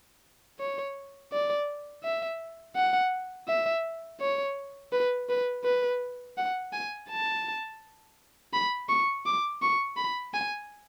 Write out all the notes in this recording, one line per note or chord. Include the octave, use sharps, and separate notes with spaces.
C#5
D5
E5
F#5
E5
C#5
B4
B4
B4
F#5
G#5
A5
B5
C#6
D6
C#6
B5
G#5